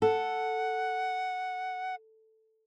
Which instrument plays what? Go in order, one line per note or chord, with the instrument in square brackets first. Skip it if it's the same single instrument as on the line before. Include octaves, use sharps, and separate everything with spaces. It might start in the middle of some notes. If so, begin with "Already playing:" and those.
[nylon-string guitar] A4 [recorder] F#5